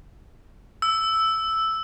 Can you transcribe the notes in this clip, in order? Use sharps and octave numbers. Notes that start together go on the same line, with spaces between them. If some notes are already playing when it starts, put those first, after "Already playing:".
E6